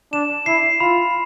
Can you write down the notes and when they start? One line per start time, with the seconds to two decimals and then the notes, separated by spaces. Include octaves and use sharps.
0.13 D4 E7
0.46 E4 C7
0.80 F4 B5